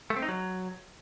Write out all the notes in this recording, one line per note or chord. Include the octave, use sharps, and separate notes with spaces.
A3
C4
D#4
F#3